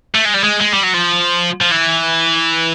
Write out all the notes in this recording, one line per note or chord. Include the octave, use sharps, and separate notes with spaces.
A3
G#3
G3
G#3
G#3
G3
F#3
F3
F3
E3